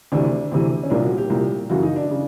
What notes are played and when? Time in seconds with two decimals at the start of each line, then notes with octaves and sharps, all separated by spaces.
0.12 D2 C3 E3 D4
0.52 D2 C3 E3
0.83 C#4
0.90 C2 A#2 D4
1.04 F#4
1.18 G4
1.30 C2 A#2
1.70 F#2 C#3 E3 F#4
1.83 D#4
1.96 D4
2.11 C#3